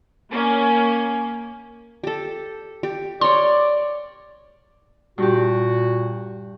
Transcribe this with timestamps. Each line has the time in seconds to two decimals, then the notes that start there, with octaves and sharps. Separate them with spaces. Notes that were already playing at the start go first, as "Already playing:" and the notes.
0.31 A#3 C#4
2.04 G4 A4
2.83 G4
3.21 A#4 C#5 D5 C6
5.18 G2 A#2 F#4 G4